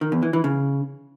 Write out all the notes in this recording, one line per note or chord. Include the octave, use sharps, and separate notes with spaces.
D#3
E2
E3
E3
C#3